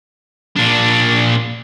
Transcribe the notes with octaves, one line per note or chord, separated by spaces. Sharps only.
A#2 D4